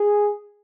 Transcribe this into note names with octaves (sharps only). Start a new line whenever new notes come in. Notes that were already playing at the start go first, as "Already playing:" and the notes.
Already playing: G#4